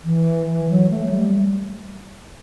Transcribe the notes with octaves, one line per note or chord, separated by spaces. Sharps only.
E3
E3
F#3
A3
A3
G3